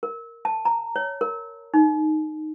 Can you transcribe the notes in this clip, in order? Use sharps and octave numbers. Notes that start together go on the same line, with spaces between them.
A#4
A5
A#5
C#5
A#4
D#4